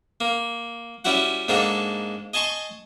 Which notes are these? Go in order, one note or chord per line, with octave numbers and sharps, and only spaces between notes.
A#3
G3 C#4 E4 F#4 F#5
G#2 A#3 D4 A4 F#5
D#5 G#5 A5 C6 C#6